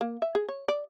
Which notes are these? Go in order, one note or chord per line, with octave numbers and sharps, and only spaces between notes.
A#3
E5
G#4
C#5
D5